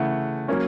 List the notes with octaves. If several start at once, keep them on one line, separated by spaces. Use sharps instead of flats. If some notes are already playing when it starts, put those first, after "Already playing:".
Already playing: C#3 E3 A3 F#5
F#3 A#3 C#4